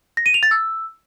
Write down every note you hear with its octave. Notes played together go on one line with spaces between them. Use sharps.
A#6
D#7
F7
A6
E6